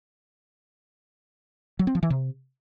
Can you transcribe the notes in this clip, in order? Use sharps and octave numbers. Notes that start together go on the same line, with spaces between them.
F#3
C4
F3
E3
C3